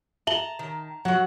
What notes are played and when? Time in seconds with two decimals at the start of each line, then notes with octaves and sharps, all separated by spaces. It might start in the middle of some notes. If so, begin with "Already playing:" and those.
0.27 E5 A5 A#5 F#7 G7
0.59 D#3
1.05 F#3 F#4 F#5